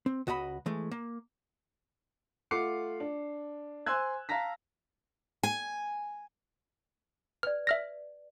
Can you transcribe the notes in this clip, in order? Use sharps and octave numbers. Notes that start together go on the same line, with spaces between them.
C4
C#2 F#4 D#5 A#5 B5
E3 G#3 A3
A#3
A3 F4 F#5 D6 C7 C#7
D4
C5 G#5 C6 E6 F#6 G#6
F5 A5 A#5 A#6 B6
G#5
B4 D5 F6
E5 F6 A#6